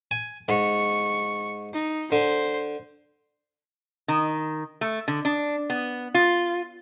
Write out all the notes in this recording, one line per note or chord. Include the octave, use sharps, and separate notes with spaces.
G#5
G#2 C#6
D#4
D3 C5
D#3
A3
D3
D4
B3
F4